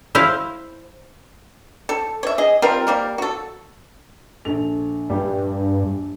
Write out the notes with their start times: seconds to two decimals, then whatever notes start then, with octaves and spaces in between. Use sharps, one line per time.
0.15 E4 C5 F5
1.89 A4
2.23 C#5 E5
2.38 G#4 D#5
2.62 G3 C4 F4 A#4
2.87 G3 A#3 A#4
3.18 F#4 A4
4.45 A#1 A4 F7
5.10 G2 G3